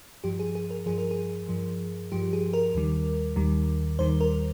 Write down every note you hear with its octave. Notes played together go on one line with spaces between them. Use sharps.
G2 F3 G4
G#4
G#4
A#4
G2 F3 G#4
A#4
G#4
G2 F3
G2 F3 G4
G#4
A#4
D#2 D#3 G3
D#2 D#3 G3
D#2 D#3 G3 C5
A#4